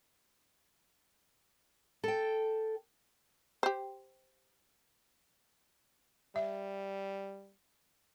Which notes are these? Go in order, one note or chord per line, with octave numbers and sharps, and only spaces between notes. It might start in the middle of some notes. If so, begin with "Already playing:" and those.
A4 G5
G4 C5
G3 E5